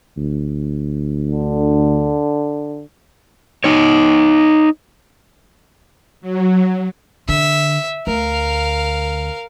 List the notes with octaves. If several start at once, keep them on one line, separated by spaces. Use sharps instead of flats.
D2
D3
D#4 C#5
F#3
D3 E5
D2 A#4 F5